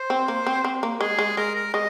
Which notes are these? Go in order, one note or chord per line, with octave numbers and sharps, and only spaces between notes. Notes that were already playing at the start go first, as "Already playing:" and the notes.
Already playing: C5
C4
A#3
C4
C4
A#3
G#3 G#4
G#3
G#3 A#4
A#4
G#3 D#5